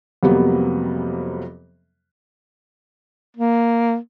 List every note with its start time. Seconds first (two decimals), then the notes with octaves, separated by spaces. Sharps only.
0.23 F2 C3 F#3 G3 A#3 B3
3.37 A#3